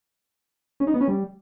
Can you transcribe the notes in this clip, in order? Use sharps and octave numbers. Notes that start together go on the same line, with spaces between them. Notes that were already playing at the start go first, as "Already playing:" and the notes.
C#4
D#4
B3
C#4
G3